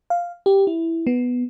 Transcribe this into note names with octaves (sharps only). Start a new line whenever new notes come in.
F5
G4
E4
B3